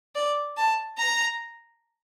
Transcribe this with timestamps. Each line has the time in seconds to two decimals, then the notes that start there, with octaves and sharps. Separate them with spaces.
0.15 D5
0.57 A5
0.98 A#5